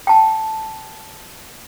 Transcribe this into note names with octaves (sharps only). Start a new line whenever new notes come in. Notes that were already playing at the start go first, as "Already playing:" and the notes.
G5 A5